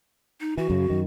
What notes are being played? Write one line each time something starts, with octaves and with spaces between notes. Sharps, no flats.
D#4
E3 F#4
F#2 C#3
F#2 D#3